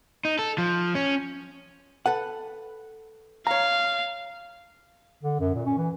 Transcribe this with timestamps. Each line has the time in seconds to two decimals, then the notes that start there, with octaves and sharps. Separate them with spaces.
0.25 D#4
0.39 A4
0.58 F3
0.95 C#4
2.06 A4 B4 F#5
3.47 C#5 F5 A#5
5.24 D3
5.40 F#2
5.55 A#2
5.66 C#4
5.78 E3